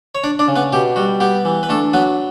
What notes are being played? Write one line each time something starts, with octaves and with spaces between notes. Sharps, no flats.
C#5
D4 D5
D4 D5
C#3
B3 B4
B2 G4
G3 F#4
B3 G4
E3
B4
A3 D4 A4
F#3 B3 B4